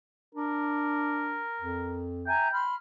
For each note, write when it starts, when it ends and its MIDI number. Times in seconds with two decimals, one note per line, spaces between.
0.35 1.43 62
0.35 2.08 70
1.61 2.36 41
2.27 2.48 76
2.27 2.61 79
2.27 2.48 80
2.27 2.48 82
2.51 2.73 83
2.51 2.73 84
2.51 2.73 89